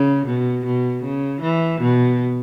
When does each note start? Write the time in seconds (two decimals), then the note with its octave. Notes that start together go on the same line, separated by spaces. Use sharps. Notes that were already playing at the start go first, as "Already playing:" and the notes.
Already playing: C#3
0.26 B2
0.65 B2
1.03 C#3
1.42 E3
1.81 B2